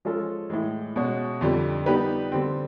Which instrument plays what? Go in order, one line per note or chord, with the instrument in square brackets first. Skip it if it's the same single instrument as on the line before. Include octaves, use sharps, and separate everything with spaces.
[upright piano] F3 G#3 C#4 F4 A4
A2 E3 G#3
B2 G#3 C#4 F#4
F2 D3 G3
G3 B3 D#4 G4 B4
D3 G3 C4